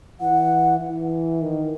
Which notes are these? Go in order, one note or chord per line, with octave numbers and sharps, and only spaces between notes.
E3 F#5
E3
D#3